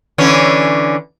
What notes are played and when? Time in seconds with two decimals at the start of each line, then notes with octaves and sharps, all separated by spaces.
0.18 D3 E3 C#4